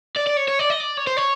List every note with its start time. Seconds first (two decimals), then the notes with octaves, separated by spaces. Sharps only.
0.16 D5
0.26 D5
0.37 C#5
0.48 C#5
0.59 D5
0.70 D#5
0.80 D5
0.97 C#5
1.07 C5
1.17 C#5